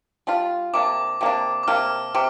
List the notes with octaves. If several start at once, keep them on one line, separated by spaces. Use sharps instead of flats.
G3 D4 F4
C3 A#3 D4 D6
C3 A#3 D4
D6
C3 A#3 D4 F6
C3 D6